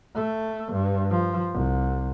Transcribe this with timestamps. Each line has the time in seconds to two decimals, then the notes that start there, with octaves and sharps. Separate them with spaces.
0.15 A3
0.73 G2
1.10 F3
1.53 C2